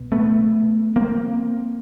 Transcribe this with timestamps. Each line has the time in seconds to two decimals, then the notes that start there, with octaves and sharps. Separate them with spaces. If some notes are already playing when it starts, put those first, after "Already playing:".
Already playing: C2 B2
0.12 A3 B3
0.96 A#3 C4